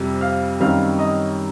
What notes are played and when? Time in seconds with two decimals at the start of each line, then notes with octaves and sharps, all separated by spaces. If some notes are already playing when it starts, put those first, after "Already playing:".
Already playing: F2 C3 G3
0.21 F5 F6
0.60 F#2 D#3 G3 C4 F5 F6
0.99 D#5 D#6